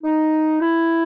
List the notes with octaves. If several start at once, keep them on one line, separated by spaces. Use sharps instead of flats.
D#4
E4